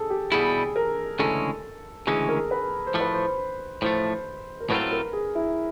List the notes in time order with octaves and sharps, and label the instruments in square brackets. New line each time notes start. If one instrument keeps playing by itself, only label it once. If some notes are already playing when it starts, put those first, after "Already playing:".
Already playing: [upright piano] G#4 A4
G4
[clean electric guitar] B2 G3 B3 E4 [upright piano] G#4
[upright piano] A#4
[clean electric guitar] D2 C#3 E3 G#3 C#4 [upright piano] A4
[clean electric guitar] D2 C#3 E3 G#3 C#4 [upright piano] G#4
[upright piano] A#4
B4
C5
[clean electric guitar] A2 F3 A3
[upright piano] B4
C5
[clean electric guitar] A2 F3 A3 [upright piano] C5
[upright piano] A#4
[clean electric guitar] A2 F#3 A3 C4 F4 [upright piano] B4
[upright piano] A#4
G#4
E4